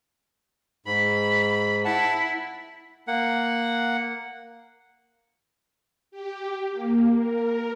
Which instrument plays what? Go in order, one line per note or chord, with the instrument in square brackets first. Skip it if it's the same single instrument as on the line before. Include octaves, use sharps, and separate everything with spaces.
[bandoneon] G#2 [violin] B5
[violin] E4 [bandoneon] F#5 A5
[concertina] A#3 F#5
[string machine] G4
A#3
A#4